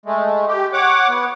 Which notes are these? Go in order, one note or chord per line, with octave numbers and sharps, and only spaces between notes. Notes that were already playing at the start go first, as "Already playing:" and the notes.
G#3 A3
G4
C#5 F#5 D6
B3